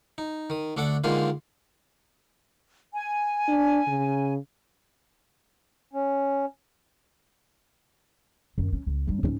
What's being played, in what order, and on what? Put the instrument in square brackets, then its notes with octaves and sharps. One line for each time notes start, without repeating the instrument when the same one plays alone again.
[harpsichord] D#4
D#3 D#6
D2 D4 A4 D5 F#5 D6
D3 D#3 G#3 A#3 F4 C5
[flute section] G#5
[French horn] D4
C#3
[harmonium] C#4
[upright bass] F#2 D#3
C#4
C#2
G2 E3
G#2 C#4